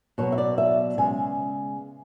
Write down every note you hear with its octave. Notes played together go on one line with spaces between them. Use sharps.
B2 F#3 B3 C#5
E5
D5
E5
C#3 G#3 B3 G#5